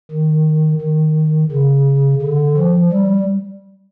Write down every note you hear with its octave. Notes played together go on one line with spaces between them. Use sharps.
D#3
D#3
C#3
D3
F3
G3